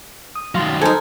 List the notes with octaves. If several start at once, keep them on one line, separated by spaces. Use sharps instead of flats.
D#6
D#3 F#3 F5 C6 A6
D#4 A4 A#4 C5 G#5 G#6